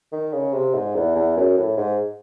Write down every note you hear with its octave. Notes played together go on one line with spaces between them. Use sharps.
D#3
C#3
C3
G#2
E2
E2
F#2
A2
G#2